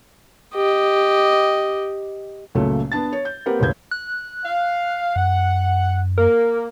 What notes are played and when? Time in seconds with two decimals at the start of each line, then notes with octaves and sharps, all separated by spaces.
0.55 G4 D#5
2.55 C#2 A#2 C#3 F#3 A3
2.92 B3 D4 A5 A6
3.13 C#5
3.25 G6
3.46 A#3 C4 G4 A#4 B4 F#5
3.59 D#1 C#2 A2 B4 G6 G#6
3.91 F#6
4.44 F5
5.16 F#2 F#5
6.18 A#3 A#4